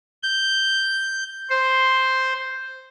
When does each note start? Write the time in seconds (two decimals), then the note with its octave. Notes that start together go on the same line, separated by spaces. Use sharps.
0.23 G6
1.50 C5